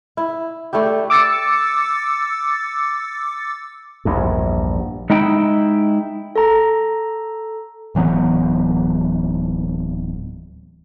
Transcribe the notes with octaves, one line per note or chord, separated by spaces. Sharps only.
E4
A3 D4 E4 G4
D6 E6 A6 C#7
A#1 E2 G2
G#3 D#4 E4 G5
A4 A#5
D1 E3 F#3 B3